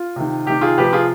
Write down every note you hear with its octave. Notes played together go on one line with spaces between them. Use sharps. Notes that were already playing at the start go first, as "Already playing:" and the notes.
Already playing: F4
C3 D#3
C3 D#3 G4
F4 G#4
C3 F3 G4 B4
F4 G#4